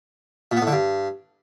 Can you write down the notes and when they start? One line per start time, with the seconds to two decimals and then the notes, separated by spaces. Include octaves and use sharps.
0.51 A#2
0.57 B3
0.62 A2
0.67 D3
0.72 G2